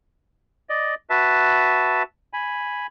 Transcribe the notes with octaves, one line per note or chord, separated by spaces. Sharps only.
D5 D#5
F#4 B4 E5 A5
G#5 B5